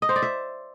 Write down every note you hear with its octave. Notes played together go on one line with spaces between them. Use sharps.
D#5
C5
D5
E5